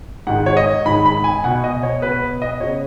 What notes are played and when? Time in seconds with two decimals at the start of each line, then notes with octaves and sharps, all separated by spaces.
0.27 G#2 D#3 G#3 F#5
0.46 C#5
0.57 D#5
0.85 G#2 D#3 G#3 B5
1.06 B5
1.24 G#5
1.43 B2 B3 F#5
1.64 D#5
1.83 C#5
2.02 B2 B3 B4
2.42 D#5
2.60 C#3 B3 C#5